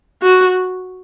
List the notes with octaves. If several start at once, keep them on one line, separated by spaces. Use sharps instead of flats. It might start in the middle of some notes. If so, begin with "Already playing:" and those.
F#4